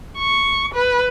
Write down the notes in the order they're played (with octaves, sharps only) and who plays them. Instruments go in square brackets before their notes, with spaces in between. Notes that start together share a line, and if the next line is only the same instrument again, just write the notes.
[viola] C#6
B4